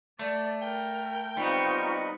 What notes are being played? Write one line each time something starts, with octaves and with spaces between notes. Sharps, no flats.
A3 D5
A#4 G5
G3 B3 C4 D#4 F4 C#6